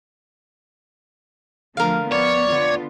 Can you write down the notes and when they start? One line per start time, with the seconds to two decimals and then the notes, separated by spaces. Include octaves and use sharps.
1.77 D3 F3 A3 A#4 F5
2.12 B3 C#5 D5
2.48 D3 B3 F4